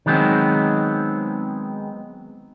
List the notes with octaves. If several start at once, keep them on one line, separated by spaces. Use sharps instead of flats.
D#3 F#3 G#3 B3 C4